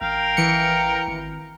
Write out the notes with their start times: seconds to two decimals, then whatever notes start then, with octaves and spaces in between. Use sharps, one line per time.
0.01 A1 A#4 F5 G5
0.37 E3 C#7
1.08 G#1